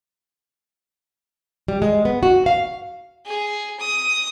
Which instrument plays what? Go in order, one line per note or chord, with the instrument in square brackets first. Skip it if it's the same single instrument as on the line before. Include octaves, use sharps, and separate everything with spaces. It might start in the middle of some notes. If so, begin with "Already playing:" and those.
[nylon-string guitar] G3
G#3
B3
F#4
F5
[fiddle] G#4
D#6